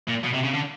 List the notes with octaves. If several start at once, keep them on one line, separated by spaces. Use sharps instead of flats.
A#2
B2
C3
C#3
D3